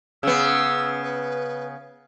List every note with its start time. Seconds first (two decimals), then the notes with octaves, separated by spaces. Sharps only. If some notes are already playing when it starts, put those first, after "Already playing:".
0.23 C#3 B3 E6
1.03 B4